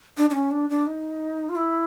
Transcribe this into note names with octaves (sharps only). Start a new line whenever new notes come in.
D4
D4
C#4
D4
D4
D#4
F4
E4